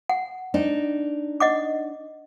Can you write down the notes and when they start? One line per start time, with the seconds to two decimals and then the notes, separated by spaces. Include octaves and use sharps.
0.09 F#5
0.54 D4 D#4
1.40 D#5 F#5 D6